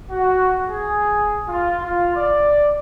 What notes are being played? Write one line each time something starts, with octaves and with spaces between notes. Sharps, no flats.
F#4
G#4
F4
F4
D5